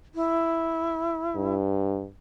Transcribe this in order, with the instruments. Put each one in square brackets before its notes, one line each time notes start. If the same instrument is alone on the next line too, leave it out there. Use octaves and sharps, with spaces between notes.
[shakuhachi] E4
[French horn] G2